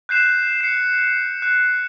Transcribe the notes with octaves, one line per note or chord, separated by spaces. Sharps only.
F#6 G6 C7 E7
C7 C#7
F#6